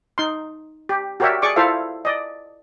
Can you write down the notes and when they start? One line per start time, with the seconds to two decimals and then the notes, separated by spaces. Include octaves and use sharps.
0.18 D#4 C6
0.89 G4
1.20 F#4 G4 A#4 C#5 D5 E5
1.42 G#4 D5 C#6 D6
1.56 E4 F4 A4 C5 E5 F5
2.05 D5 D#5